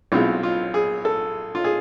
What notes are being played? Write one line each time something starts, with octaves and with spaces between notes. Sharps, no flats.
B1 B2 G#3 C4 E4 F4
F4
G#4
A4
F4
G#4